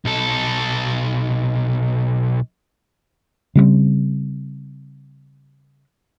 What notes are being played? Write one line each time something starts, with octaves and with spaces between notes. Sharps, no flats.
B1 A4
C#3 G3 A3 C4